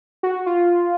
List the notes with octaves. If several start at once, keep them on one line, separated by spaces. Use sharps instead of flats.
F#4
F4